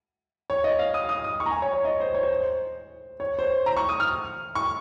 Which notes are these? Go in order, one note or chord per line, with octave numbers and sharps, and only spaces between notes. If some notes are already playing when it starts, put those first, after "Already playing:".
C#5
D#5
F5
D#6
D#6
D#6
C#6
A#5
G#5
C#5
C#5
D#5
C5
C#5
C5
C5
C#5
C5
C#5
A#5
C#6
D#6
F6
C#6